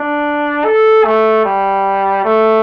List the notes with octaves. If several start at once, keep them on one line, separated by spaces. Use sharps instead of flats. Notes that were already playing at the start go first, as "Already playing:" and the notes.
Already playing: D4
A4
A3
G3
A3